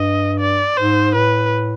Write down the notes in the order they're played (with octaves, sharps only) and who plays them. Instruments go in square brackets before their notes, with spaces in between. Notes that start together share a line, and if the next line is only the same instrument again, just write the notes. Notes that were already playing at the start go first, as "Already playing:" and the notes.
Already playing: [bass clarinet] G2 [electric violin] D#5
[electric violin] D5
[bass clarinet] G#2 [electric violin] C5
[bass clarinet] A2 [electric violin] B4